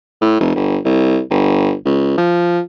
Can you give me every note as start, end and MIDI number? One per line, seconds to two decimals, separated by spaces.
0.22 0.39 45
0.40 0.53 29
0.55 0.79 31
0.85 1.20 36
1.31 1.74 31
1.85 2.16 37
2.17 2.60 53